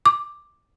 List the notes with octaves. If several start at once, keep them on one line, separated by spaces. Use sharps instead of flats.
D6